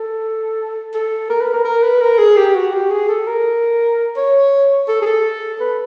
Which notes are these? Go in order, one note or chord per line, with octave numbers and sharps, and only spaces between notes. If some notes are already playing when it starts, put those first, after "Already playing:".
Already playing: A4
A4
A#4
B4
A#4
A#4
B4
A#4
G#4
G4
F#4
G4
G#4
A4
A#4
C#5
A4
G#4
A4
B4